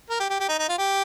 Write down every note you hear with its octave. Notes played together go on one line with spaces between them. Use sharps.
A#4
G4
G4
G4
D#4
D#4
F4
G4